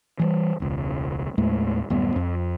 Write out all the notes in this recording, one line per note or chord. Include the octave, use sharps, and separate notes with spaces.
E3 F#3 G3
E1 C#2
D#2 A2 G#3 A3
D1 F#2 G3 B3
F2